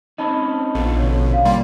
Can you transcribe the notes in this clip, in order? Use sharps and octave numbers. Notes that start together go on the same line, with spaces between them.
C4 C#4 D#4 D#5 A5 B5
A#1 B3 F4 A4
B2 D3 C#4 C#5
F5
G3 A#3 C6